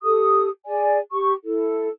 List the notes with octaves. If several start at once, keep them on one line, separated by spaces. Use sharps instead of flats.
G4 A4 D#6
G#4 D5 G#5
G4 C#6
E4 A4